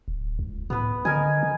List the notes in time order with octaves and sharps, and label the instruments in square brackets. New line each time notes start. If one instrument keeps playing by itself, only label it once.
[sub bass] D1
C#2
[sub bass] A2 [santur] B3 B4
[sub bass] D3 [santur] A#4 D#5 G#5
[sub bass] D3